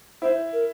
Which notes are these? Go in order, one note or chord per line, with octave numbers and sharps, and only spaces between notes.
E4 C5
A#4